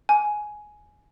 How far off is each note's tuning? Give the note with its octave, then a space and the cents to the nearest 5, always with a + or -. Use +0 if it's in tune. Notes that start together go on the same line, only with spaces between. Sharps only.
G#5 +10